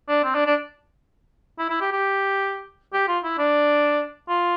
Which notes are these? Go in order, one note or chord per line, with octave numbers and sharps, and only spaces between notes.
D4
C4
D4
D4
E4
E4
G4
G4
G4
F4
E4
D4
F4